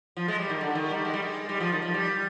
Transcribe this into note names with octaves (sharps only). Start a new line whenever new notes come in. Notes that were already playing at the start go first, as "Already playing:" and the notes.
F3
G#3
G3
D#3
D3
D#3
G3
G#3
G3
G#3
G3
F3
D#3
F3
G3